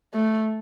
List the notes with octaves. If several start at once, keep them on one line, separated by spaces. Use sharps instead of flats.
A3